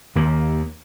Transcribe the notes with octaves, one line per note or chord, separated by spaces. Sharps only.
D#2 D#3 A#3